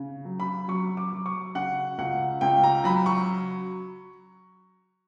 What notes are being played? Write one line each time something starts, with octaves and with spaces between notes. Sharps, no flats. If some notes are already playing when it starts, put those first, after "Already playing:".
Already playing: C#3
F#3
B5
F#3 C#6
D6
F#3
C#6
C#3 F#5
C#2 F#5
C#2 G5
A#5
F#3 B5
C#6